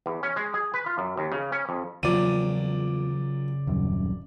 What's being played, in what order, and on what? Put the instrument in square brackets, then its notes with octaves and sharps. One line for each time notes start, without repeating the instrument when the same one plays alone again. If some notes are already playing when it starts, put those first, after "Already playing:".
[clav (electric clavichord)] E2
C#4
G#3
G#4
B4
F4
F#2
D#2
C#3
C#4
F2
[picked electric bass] E2 F3 [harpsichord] A#2 F#3 [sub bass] C#3 [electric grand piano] D5 D#7
[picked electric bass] D#1 F#2